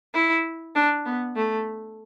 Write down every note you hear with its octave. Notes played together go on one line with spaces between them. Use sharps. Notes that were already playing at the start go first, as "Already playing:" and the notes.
E4
D4
B3
A3